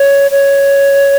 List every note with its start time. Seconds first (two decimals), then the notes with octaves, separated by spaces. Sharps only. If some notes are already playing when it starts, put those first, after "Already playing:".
Already playing: C#5
0.31 C#5